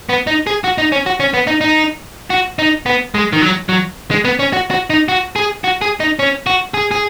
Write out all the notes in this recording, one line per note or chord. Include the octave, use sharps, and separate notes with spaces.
B3
D#4
G#4
F#4
D#4
C#4
F#4
C#4
B3
D#4
D#4
F#4
D#4
B3
G#3
D#3
F#3
F#3
G#3
B3
C#4
F#4
F#4
D#4
F#4
G#4
F#4
G#4
D#4
C#4
F#4
G#4
G#4